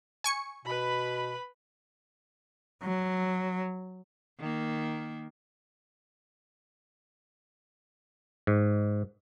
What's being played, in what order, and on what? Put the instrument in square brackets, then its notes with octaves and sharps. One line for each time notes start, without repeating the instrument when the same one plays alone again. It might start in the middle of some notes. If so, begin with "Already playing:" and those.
[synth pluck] G#5 C#6 C#7
[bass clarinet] B2 [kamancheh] B4 B5
[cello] F#3
[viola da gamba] D#3 A#3
[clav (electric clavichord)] G#2